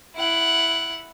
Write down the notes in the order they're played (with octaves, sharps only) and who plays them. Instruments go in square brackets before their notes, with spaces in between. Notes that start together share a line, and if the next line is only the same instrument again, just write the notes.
[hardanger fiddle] E4 F#5